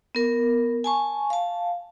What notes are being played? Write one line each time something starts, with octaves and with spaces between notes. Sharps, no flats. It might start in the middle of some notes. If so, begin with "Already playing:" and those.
B3 A#4
G#5 A5 C#6
F5 A5